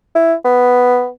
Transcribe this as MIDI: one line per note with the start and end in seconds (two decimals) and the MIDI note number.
0.15 0.34 64
0.45 1.09 59